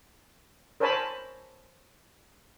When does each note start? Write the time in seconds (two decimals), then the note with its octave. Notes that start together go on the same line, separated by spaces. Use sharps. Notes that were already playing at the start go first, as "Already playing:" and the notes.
0.80 A#4 C5 C#5 G#5 A5 B5